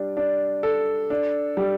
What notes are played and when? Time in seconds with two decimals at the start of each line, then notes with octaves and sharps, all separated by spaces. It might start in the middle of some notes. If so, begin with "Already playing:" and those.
Already playing: G3 D4
0.17 D4
0.63 A4
1.10 D4
1.57 G3